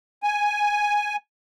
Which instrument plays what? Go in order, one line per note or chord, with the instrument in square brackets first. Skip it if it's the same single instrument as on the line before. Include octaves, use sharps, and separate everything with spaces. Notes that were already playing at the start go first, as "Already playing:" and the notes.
[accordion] G#5